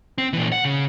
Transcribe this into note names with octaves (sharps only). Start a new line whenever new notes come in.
C4
A#2 E3
F#5
C#3